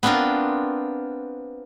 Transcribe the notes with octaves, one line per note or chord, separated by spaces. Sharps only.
B3 C4 D4 F4 A#4